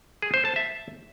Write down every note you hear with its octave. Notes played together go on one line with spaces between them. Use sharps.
G#4
C5
A5
E5